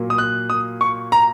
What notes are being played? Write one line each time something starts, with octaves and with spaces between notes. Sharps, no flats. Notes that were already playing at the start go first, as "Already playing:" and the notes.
Already playing: A#2 F#3 A#3
D#6
F#6
D#6
C#6
A#5